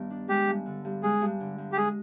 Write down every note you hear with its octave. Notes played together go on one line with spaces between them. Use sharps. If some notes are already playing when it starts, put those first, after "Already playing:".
Already playing: G2 D#3 B3
D4
G#3 G4
G2
D3
G2
G#3 G#4
G2
D3
G2
G4
G#3 G#4